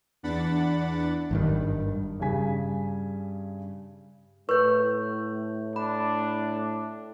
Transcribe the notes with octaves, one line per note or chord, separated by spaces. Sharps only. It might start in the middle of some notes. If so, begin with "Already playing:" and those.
E2 D4 F#5 B5 A6
G#1 G2 D#3
G2 C#3 G3 G#5 B6
A2 B4 C#6 G6
D4 B5